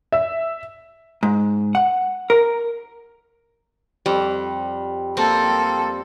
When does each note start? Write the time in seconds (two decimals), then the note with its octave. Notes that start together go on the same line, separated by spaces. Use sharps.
0.12 E5
1.23 G#2
1.75 F#5
2.30 A#4
4.06 F2 G3
5.17 A#3 C4 A4